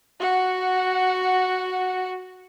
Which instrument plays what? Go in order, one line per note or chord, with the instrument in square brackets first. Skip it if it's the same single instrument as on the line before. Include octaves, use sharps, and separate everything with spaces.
[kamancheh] F#4 F#5